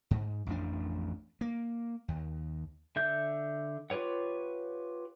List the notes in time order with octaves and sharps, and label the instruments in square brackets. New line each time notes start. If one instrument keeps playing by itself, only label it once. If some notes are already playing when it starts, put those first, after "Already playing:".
[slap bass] G#2
A1 F2 F3 D4
A#3
D#2
[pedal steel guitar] D3 E5 G6
F4 G4 B4 C#5 F#5